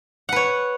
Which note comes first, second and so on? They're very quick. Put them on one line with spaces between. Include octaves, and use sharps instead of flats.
F#5 B4 C#5